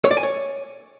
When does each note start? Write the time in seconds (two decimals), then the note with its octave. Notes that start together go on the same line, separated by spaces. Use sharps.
0.05 C#5
0.11 D5
0.17 G#5
0.23 C#5